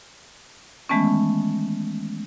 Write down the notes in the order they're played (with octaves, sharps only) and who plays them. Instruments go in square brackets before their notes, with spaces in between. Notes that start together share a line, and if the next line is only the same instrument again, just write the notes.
[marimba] D#3 E3 G#3 A3 B3 C#4